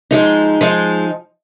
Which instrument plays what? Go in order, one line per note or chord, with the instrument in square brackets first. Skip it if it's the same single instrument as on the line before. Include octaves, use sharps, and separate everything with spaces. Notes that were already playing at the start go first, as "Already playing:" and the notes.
[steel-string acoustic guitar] F3 G#3 D#4
F3 G#3 D#4